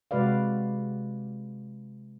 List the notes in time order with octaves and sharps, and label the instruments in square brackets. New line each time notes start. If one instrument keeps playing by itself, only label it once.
[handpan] C3 G#3 F#4 B4 D5 F5